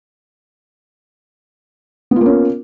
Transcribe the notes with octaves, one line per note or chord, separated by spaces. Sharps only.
A#3 B3 C#4 F4